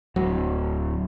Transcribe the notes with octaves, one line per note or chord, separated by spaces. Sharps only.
D1 F#3